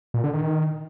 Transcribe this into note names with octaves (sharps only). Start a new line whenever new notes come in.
A#2
D3
D#3